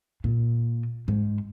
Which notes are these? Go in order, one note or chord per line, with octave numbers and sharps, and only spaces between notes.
A#2
G#2